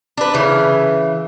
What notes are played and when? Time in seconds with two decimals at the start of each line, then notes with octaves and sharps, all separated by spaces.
0.17 D4 B4
0.34 C#3 E3